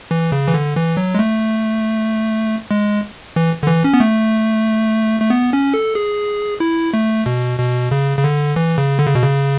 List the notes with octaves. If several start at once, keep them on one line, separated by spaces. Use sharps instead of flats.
E3
C#3
E3
D3
E3
F#3
G#3
A3
G#3
E3
D3
E3
C#4
B3
A3
A3
B3
C#4
A4
G#4
E4
A3
B2
B2
C#3
C#3
D3
E3
C#3
D3
C#3
B2
C#3